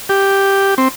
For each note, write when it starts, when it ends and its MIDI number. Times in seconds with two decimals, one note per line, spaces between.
0.09 0.74 67
0.78 0.88 60